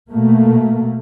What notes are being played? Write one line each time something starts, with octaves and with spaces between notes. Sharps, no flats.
B2 A3 A#3